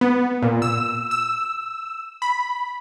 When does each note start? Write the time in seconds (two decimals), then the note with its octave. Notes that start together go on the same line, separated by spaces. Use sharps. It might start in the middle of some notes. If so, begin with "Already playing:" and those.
0.01 B3
0.42 A#2
0.62 E6
1.11 E6
2.22 B5